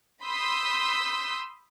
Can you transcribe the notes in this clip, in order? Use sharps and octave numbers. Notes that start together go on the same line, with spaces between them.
B5 C6 D#6 E6 G6 B6